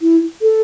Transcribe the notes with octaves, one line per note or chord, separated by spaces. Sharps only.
E4
A4